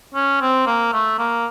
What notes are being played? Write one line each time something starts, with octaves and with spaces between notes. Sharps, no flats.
C#4
C4
A#3
A3
A#3